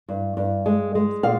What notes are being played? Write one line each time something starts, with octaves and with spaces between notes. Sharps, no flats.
G2
G2
G#3
G#3
A#2 F5